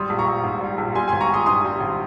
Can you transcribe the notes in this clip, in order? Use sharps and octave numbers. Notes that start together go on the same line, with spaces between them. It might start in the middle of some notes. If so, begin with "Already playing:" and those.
Already playing: G#1 G3 C6 D#6
A#1
A#5 C#6
A#1
G#2
G3
A#1
G3 G#5 C6
G#1 G#5 C6
A#5 C#6
G#1 C6 D#6
G2 C6 D#6
G3
G#1